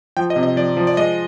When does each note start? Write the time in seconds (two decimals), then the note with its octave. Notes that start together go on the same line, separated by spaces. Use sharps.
0.17 F3 G5
0.30 D#5
0.36 C3
0.43 D#5
0.56 F3 D5
0.77 F3
0.87 D5
0.97 G#3 D#5